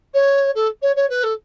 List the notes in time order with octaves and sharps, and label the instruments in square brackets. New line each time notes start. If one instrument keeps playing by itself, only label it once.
[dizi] C#5
A4
C#5
C#5
B4
A4